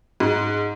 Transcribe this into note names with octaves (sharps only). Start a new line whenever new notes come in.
G#2